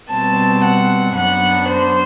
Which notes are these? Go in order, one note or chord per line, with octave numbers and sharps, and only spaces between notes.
B2 G3 C4 A5
F#5
F#2 F#3 B3 D4 F#5
C5